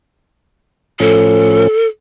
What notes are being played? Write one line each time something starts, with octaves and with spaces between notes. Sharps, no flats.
A2 F3 C#4 A4